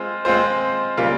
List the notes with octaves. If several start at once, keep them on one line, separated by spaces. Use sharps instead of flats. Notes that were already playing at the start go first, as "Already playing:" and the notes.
Already playing: G#3 C4 F4 C5
G#3 C4 F4 C5
C#3 G3 A#3 F4